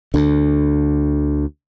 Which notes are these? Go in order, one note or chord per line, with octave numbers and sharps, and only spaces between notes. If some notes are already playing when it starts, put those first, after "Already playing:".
D2 D3